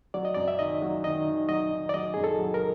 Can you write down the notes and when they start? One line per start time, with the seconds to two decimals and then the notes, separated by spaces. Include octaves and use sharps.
0.14 F#3 D5
0.25 D#5
0.34 F#2 D5
0.48 E5
0.59 D#3 D#5
0.82 F#3
1.04 D#3 D#5
1.27 D#3
1.49 F#3 D#5
1.71 D#3
1.89 D5
1.94 F#3 D#5
2.14 F#2 G#4
2.24 A4
2.39 F#3
2.54 A#4